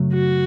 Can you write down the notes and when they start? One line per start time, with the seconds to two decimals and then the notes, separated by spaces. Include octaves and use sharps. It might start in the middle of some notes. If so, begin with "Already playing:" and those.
Already playing: F#2 C#3 F#3 A3
0.13 F#4